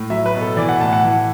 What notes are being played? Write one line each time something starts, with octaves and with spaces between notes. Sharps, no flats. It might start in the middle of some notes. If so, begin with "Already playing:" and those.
Already playing: A2
F#3 E5
B4
B2
A4
E3 D5
F#5
A2 A5
F#5
E3